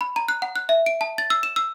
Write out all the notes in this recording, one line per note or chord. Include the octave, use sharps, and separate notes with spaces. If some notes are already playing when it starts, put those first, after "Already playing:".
B5
A#5
F#6
F#5
F#6
E5
D7
A5
A6
E6
E7
E6